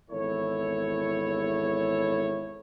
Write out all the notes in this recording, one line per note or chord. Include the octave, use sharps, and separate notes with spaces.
G#1 E2 E4 A4 C#5